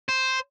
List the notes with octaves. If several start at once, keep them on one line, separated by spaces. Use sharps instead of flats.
C5